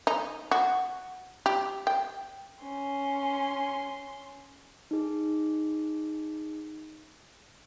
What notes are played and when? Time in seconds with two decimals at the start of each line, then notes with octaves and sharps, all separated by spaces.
0.07 D#4
0.51 F#4
1.46 G4
1.87 G5
2.62 C#4 C6
4.91 D#4 G#4